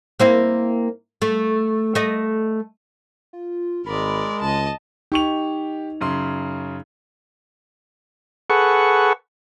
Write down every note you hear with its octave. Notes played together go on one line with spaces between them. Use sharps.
A#3 C4 E4
A3
A3 D#5
F4
G#1 G#3 A#4 D5 B5
C#2 D#5 A5
D#4 G4 C#6 F7
F#2 C#3 C6
G#4 A4 B4 F#5 C#6